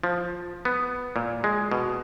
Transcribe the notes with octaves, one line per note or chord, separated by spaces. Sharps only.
F3
B3
A#2
G#3
B2